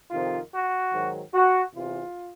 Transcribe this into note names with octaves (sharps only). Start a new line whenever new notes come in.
F2 C3 D#3 F4
F#4
G#2 D#3 F#3
F#4
E2 C3 E3 F4